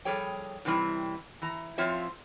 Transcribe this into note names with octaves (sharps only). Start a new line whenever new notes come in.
F3 G3 G#4 A4 C#5 G5
A2 C3 E3 G3 C4 E4
E3 A#5
F3 C4 F4 C#5 E5